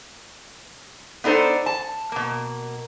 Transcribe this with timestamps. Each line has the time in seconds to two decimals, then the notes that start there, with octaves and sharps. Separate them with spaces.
1.24 B3 D4 D#4 A4 C5
1.66 A5
2.12 B2 A#3